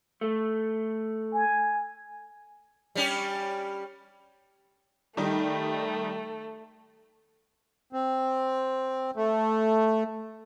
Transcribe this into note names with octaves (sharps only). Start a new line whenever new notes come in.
A3
G#5
G3 C#4 G4
D#3 G3 A3 D#4
C4
A3